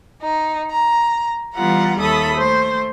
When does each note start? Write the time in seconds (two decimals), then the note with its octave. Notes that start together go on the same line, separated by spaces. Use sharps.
0.23 D#4
0.72 A#5
1.55 E3 G3 B3 F4 F#5 A#5
1.99 D#2 A4 E5 B5 D#6
2.36 A3 C5